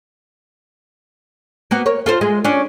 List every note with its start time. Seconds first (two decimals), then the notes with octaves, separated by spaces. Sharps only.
1.71 A#3 B3 F#4
1.86 A#4 C#5
2.06 F4 A4 C5
2.21 G#3
2.45 C#4 D4